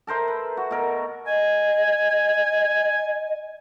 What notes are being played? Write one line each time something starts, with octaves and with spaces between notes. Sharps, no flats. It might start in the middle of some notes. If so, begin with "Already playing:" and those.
A4 A#4 C5 E5
B4
F#4
B2 A#4
D#5 G#5